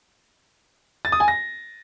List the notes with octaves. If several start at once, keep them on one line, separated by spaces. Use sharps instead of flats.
A6
D#6
G#5
A#6